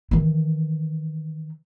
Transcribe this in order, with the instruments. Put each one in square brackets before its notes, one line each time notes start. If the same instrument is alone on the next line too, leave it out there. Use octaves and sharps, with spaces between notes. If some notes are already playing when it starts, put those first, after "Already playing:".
[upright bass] D#3 E3